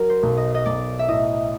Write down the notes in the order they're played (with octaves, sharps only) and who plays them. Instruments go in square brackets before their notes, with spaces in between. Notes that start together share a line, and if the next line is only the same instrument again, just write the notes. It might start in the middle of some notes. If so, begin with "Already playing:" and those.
Already playing: [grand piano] F#3 [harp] A#4
[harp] C5
[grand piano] B1
[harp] D#5
D#5
[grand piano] B1 [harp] D5
[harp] E5
[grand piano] A2 [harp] D#5